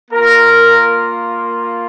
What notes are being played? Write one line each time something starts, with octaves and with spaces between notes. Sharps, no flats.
A#3 F4 A#4